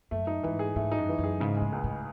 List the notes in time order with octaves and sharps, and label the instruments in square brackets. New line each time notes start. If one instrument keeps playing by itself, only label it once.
[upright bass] F#2 [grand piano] A3
[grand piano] D#4
[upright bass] G#2 [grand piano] E3
[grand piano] G#4
[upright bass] G#2 [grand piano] A3
[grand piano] D#4
[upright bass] F#2
[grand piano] E3
[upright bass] F#2
[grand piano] G#4
[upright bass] G#2 [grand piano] C#3
[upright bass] A2 [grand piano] G#3
[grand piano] C#2
[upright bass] A2